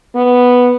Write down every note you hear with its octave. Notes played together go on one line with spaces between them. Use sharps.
B3